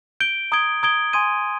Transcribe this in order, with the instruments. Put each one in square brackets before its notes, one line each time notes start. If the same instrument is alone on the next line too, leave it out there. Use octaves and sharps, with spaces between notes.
[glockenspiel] G6 D7 G7
A#5 D#6 G#6 D7 G7
A#5 D#6 G#6 D7 G7
G#5 C6 D#6 G#6 D#7